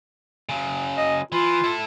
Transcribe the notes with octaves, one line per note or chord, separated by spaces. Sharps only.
C#3 F#3
D#5
E3 F4
E4 A4